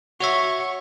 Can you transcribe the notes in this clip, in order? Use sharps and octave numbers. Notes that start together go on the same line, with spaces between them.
F#4 C#5 E5 C#6